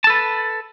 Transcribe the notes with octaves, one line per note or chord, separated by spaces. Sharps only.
A4 B4 A5